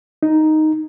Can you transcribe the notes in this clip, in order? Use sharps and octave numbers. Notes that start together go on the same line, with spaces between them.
D#4